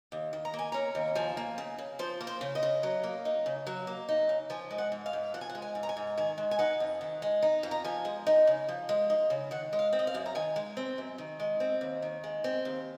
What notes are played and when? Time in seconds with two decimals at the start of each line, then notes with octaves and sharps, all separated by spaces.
0.12 D#2
0.33 D#3
0.45 A#5
0.54 A#3
0.59 G#5
0.72 C#4 A#5
0.95 D#2
1.15 F3 G#5
1.37 A#3
1.58 C#3
1.78 C#3
1.99 F3 C5
2.21 A#3
2.27 C5
2.41 C#3
2.55 D#5
2.63 C#3
2.83 F#3
3.04 A#3
3.25 D#4
3.46 C#3
3.67 F#3
3.87 A#3
4.09 D#4
4.29 C#3
4.50 F3 G#5
4.71 G#3
4.78 F#5
4.92 G#2
5.06 F5
5.13 G#2
5.34 F3 F#5
5.41 G#5
5.49 F#5
5.55 G#3
5.62 G#5
5.75 G#2
5.83 A#5
5.89 G#5
5.97 G#2
6.17 D#3 G#5
6.38 G#3
6.51 G#5
6.59 D#4 F#5
6.80 F2
7.01 D#3
7.22 G#3
7.42 D#4
7.63 F2
7.71 A#5
7.84 F3 G#5
8.05 G#3
8.27 D#4
8.47 C#3
8.68 F3
8.89 G#3
9.10 D#4
9.30 C#3
9.51 D#3 F#5
9.73 G#3
9.79 F5
9.93 C4
9.99 D#5
10.07 F5
10.14 F#2
10.26 A#5
10.35 D#3 G#5
10.56 G#3
10.77 C4
10.98 F#2
11.18 D#3
11.40 G#3
11.60 C4
11.81 D#2
12.02 D#3
12.24 G#3
12.44 C4
12.65 D#2